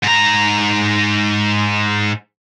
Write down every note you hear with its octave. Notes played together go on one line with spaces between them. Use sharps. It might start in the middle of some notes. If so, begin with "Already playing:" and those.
G#2 A#5